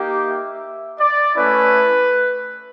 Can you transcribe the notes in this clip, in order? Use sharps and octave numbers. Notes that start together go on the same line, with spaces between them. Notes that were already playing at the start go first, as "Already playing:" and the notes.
Already playing: A#3 D#4 G4
E5
D5
A3 C#4 E4 B4